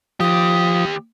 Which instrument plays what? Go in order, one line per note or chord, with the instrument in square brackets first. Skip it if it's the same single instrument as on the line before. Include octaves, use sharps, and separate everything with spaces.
[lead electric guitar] D#2 G4 [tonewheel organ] F3 [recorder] D#6